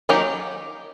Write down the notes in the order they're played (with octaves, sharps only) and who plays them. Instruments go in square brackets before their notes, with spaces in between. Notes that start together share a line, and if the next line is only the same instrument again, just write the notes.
[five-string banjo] D#3 F#3 A#3 D#4 G4